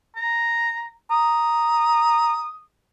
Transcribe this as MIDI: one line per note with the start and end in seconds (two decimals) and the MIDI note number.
0.16 0.91 82
1.11 2.44 82
1.11 2.61 87